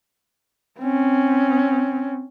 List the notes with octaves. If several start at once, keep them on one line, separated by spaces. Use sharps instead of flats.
C4 C#4